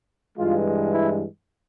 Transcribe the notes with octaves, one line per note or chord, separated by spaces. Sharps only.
G2 E3 G#3 F4
E4